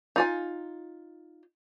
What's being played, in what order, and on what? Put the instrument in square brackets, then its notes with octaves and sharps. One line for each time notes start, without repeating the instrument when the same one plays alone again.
[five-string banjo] D#4 F4 G#5